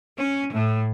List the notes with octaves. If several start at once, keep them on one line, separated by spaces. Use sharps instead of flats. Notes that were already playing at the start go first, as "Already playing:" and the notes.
C#4
A2